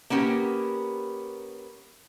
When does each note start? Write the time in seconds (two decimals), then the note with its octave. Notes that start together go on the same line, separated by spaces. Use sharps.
0.10 A#3 B3 C#4 G4